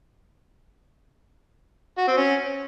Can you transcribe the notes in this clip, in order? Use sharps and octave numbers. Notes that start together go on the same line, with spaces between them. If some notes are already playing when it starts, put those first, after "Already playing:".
F#4
C4
C#4